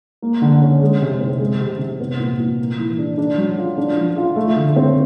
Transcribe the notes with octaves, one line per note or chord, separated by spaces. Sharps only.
A#3
D3
C#4
G#3
C3
C4
G#3
C3
C3
B3
A#2
A#2
A#3
E3
D4
D4
F#3
F4
D4
F3
F4
A3
D3
C4